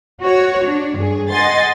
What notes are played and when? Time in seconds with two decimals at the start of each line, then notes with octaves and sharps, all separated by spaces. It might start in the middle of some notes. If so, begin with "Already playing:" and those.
0.22 F#4 C#5
0.65 D4
0.97 G2 G#4
1.30 D#5 F#5 G#5 C6 A6